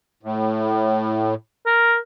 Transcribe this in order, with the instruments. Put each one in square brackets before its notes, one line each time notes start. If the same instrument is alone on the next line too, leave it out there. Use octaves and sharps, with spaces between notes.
[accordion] A2
[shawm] A#4